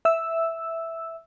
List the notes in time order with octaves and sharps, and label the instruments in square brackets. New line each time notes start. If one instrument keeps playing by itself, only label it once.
[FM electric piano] E5 E6